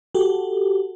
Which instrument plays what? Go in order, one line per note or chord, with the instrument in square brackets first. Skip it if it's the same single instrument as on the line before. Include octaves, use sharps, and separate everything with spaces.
[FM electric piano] F#4 G4 A4